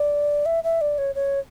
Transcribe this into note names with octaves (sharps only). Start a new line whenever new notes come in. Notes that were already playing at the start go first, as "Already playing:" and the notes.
Already playing: D5
E5
E5
D5
C#5
C#5